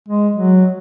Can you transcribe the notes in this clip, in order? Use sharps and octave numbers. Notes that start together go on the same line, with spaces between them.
G#3
F#3